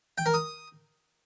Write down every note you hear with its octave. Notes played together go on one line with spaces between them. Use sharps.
G5
A#4
D#6